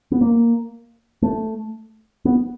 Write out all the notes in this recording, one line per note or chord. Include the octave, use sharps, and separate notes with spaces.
B3
A#3
A3
B3